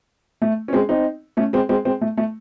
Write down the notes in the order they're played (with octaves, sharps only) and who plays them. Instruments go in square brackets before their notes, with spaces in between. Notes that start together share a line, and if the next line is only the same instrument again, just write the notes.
[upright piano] A3
C#4
G#3 C4
C4 D#4
A3 C#4
G#3 C4
G#3 C4
G#3 C4
A3
A3